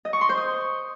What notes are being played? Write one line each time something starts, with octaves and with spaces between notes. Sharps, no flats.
D#5
C#6
C6
C5
D#6